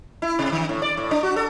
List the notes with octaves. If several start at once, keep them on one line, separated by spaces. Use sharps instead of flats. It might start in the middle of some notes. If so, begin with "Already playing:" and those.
E4
C3
D#3
A2
D5
A2
D4
F#4
A4